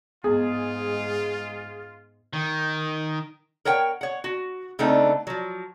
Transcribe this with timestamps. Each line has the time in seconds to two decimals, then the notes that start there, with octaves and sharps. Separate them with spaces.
0.24 G#2 G#3 B3 F4 G#4
2.33 D#3
3.65 A#4 C#5 F#5 G5
4.01 C#5 F#5
4.24 F#4
4.79 C#3 A3 B3 C4 D4 D#4
5.27 F3 F#3